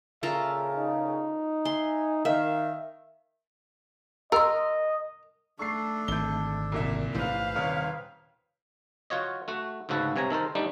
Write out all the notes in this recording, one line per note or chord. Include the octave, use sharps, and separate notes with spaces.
A#2 C#3 F4 A4 A#4 E5
D#4
E5 G#5 C6
D#3 E5 F5
A#4 D#5 C6 E6
A3 D4 A4 C#6 C7
G#1 D3 G6 G7
C2 A#2 E5
A1 G#2 E3 B4 C5 F5
D#1 C3 C#5
F4 F#4 C#5 D#5
A3 F#4
D2 G#2 C#3 F#4 A4 B4
G2 C3 C#5 G#5 A#5
D#3 A4 A#4 C5
G3 A3 D4 D#4